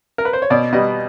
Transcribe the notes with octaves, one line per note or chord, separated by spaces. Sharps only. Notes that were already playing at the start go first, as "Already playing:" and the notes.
A#4
B4
C5
C#5
B2 D5
G3 B3 D#5